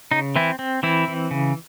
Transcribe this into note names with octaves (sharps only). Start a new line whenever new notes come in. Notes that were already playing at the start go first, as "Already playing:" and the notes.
C#3 D#4
E3 C4 E4
C4
E3 C4 E4
E3
C#3